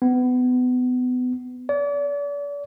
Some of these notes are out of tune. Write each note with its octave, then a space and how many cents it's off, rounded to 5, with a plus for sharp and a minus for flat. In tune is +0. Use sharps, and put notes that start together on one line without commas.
B3 +25
D5 -40